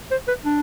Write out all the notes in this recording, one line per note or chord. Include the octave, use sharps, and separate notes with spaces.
C5
B4
D4